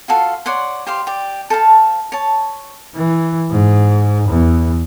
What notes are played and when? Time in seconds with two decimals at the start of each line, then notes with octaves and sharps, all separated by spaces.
0.08 F4 F#4 A4 F5
0.46 C#5 D5 F#5 C6
0.87 G4 C5 F5 C6
1.07 G4 D5
1.50 A4 C5 F5 A5
2.12 C#5 A5
2.96 E3
3.51 G#2
4.29 E2